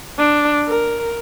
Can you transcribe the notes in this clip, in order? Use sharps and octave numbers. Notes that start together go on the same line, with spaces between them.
D4
A#4